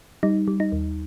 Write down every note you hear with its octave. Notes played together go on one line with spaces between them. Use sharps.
G3 D#4
G3
D#4
D#2